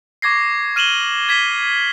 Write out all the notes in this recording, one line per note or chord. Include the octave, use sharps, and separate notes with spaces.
C#6 D6 G#6 A#6 C7
F6 D#7 E7 F#7 G7
G#6 B6 E7 G7